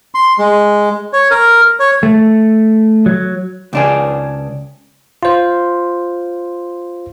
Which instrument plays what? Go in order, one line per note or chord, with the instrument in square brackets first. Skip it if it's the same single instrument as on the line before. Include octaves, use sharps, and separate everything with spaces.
[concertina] C6
G#3
C#5
A#4
C#5
[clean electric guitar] A3
F#3
[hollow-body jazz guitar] C#2 D4 G#4
[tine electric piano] F4 C5